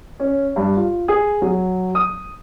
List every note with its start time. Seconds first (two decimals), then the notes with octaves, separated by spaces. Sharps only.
0.20 C#4
0.56 G2
0.76 F4
1.08 G#4
1.42 F#3
1.95 D#6